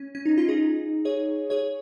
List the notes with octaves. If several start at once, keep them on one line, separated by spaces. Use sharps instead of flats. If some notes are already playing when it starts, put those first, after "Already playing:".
Already playing: C#4
C#4
D#4
C#4 F4
D#4 G#4
G#4 C#5
G#4 C#5